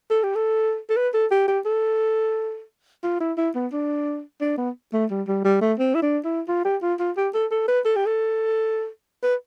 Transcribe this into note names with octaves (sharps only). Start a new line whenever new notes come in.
A4
G4
A4
A4
B4
A4
G4
G4
A4
F4
E4
E4
B3
D4
D4
B3
A3
G3
G3
G3
A3
C4
E4
D4
E4
F4
G4
F4
F4
G4
A4
A4
B4
A4
G4
A4
B4